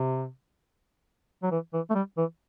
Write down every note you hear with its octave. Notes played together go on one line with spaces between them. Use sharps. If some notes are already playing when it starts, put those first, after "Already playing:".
Already playing: C3
F#3
E3
E3
A3
G3
E3